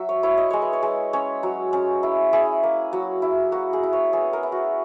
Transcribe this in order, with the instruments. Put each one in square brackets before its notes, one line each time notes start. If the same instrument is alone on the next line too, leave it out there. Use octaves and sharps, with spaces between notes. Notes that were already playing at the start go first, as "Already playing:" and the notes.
Already playing: [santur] F#3 E5
C#5
E4 C#5
D#5
G#3 C#5
B4
C#5
G#3
C#4 C#5
F#3
C#4
E4
E4 G#4
A#3
F#3
E4
A#3 F#4
G#4
E4
C#5
B3 G#4
A#4
E4
F#4